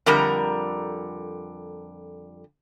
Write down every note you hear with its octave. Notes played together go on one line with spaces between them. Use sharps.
F2 D3 G3 A#4 A#5